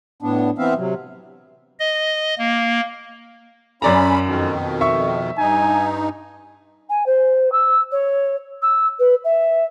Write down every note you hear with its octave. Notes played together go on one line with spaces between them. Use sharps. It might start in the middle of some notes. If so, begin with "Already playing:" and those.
A2 B3 D4
E3 B3 C4 E5 F5
C3 F#3
D#5
A#3
F#2 C#4 D5 A#5 B5
F2 B2 D#3
E5 C#6
G2 D#4 G#5
G#5
C5
E6
C#5
E6
B4
E5